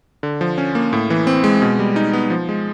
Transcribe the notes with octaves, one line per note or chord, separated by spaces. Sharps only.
D3
F3
C#4
A#3
A2
E3
C4
G#3
B2
G3
D#4
B3
F3
G#3